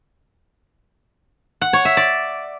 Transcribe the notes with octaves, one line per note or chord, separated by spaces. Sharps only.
F#5
C#5
E5
D5